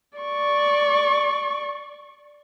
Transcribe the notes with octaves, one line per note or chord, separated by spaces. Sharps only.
D5 C#6